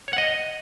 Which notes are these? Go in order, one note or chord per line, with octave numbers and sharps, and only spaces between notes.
C#5
F#5
D#5